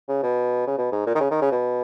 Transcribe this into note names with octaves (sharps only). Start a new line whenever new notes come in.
C#3
B2
C#3
B2
G#2
A#2
D#3
C#3
D#3
C#3
B2